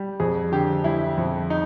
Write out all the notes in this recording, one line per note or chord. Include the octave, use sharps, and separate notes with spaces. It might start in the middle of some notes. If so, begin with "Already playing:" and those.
Already playing: G3
F2 G#4
D3 G4
G3 E4
F2
D#4